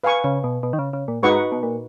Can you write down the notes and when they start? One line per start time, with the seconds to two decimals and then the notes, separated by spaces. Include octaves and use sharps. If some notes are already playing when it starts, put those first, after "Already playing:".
0.04 B4 F5 G#5 C#6
0.24 C#3
0.44 B2
0.63 B2
0.73 D#3
0.79 C#3
0.93 C#3
1.08 A#2
1.23 G#2 D#4 F#4 B4 F#5 C#6
1.52 B2
1.63 A#2